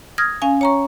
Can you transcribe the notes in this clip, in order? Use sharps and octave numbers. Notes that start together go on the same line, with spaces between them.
D#6 F6 G#6 A#6
C#4 F5 G#5
C#5 A#5 C#6